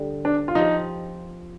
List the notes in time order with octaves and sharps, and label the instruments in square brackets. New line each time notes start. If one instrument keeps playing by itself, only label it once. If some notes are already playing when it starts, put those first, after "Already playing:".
Already playing: [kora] D3 G3
[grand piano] D4
F4
[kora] F3 C4 G4 [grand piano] D#4